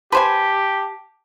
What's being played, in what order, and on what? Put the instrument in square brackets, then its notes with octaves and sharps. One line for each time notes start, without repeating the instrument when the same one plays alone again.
[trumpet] G4 [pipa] B4 C5 G#5 [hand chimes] A5